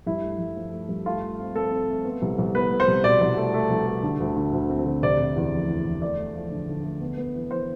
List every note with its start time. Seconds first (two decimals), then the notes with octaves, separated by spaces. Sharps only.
0.06 G2 E4
0.23 A3
0.39 G2
0.56 F3
0.72 A3
0.89 G2
1.06 A3 F4
1.21 A3
1.39 C4
1.55 C4 A4
1.72 C4
1.89 A3
2.05 B3
2.22 C2
2.38 C2
2.55 B3 B4
2.71 B3
2.80 C5
2.88 C2
3.04 B2 D5
3.21 C2
3.37 A3
3.54 A3
3.70 C2
3.86 A3
4.03 D3
4.20 D2
4.36 D3
4.53 D2
4.70 C4
4.86 D2
5.02 C3 D5
5.20 C3
5.36 E2
5.52 F1
5.68 E3
5.85 E2
6.02 A3 D5
6.18 A3
6.35 F3
6.51 D3
6.69 D3
6.84 A3
7.01 B3
7.17 B3
7.35 E3
7.51 E3 C5